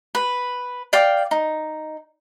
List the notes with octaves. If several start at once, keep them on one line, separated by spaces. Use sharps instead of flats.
B4
D5 F5 G5 D6
D#4